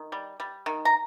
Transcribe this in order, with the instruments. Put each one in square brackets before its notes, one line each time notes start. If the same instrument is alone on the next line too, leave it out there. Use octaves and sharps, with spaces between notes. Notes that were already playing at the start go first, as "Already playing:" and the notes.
Already playing: [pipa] D#3
G3
G3
D#3
A#5